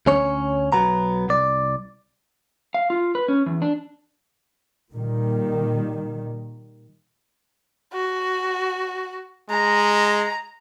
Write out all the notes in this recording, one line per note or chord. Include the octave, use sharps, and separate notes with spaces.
D2 C#4 C#5
B1 F#3 B3 A#5
C2 D5
F5
F4
B4
C#4
E2
D4
A#2 D#3 G3
F#4
G#3 A#5